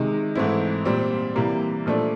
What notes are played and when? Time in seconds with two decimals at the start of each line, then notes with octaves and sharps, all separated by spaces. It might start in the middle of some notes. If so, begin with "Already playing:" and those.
Already playing: C3 D#3 G#3
0.35 G#2 E3 A3 C4 E4
0.85 A#2 G3 C4
1.36 C3 E3 G3 A#3
1.86 A#2 F3 A3 D4